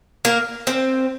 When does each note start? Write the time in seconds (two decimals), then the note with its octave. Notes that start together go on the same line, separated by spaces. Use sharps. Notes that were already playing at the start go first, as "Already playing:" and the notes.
0.25 A#3 A#4
0.67 C4 C5